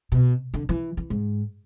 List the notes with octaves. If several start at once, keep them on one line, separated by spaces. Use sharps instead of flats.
B2
D3
E3
E3
G#2